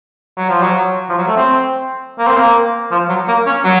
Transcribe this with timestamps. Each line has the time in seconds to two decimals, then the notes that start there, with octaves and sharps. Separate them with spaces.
0.37 F#3
0.50 F3
0.62 F#3
1.09 F3
1.18 F#3
1.27 A3
1.36 C4
2.19 A#3
2.27 C4
2.37 A#3
2.91 F3
3.09 F#3
3.28 A#3
3.46 C#4
3.64 F#3